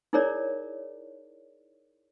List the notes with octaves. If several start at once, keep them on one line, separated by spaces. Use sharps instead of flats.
D#4 E4 G#4 A#4 C#5 D5